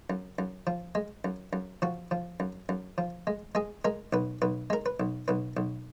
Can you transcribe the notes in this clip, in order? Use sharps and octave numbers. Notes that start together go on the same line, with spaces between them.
F#2
F#2
F3
G#3
F#2
F#2
F3 F#4
F3
F#2
F#2
F3
G#3
G#3 G#4
G#3 A#4
B1 B4
B1 B4
G#3 A#4
B4
B1
B1 B4
B1